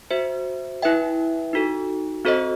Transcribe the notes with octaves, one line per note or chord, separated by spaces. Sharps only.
F#4 C5 E5
E4 B4 E5 G5
D#4 F#4 A4
C4 F#4 A4 C5 D#5